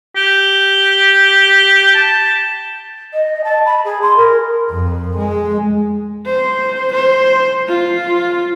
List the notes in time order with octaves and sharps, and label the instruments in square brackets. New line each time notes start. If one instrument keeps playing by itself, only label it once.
[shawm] G4
A5
[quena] D#5
A5
B5
G#4
C6
A#4
[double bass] F2
G#3
[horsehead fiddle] C5
C5
F4